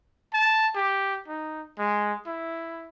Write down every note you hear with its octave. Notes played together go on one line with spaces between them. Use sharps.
A5
G4
D#4
G#3
E4